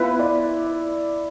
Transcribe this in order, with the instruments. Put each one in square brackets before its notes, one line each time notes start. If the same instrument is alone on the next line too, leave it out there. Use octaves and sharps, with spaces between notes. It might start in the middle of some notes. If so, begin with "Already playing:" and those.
Already playing: [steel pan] B3 F4 B4 [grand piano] E4
[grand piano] D5